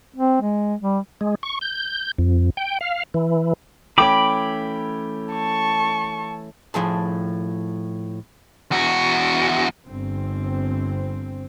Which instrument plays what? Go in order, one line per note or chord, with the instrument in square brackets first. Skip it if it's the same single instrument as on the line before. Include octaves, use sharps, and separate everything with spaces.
[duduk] C4
G#3
G3
[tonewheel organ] G#3
C#6
G6
F2
G5
F5
E3
[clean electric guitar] E3 A3 C#4 [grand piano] G5 [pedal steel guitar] B5 D6
[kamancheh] A5 C#6
[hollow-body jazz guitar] A2 F3 G#4 A5
[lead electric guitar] E2 F#4
[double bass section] G1 C4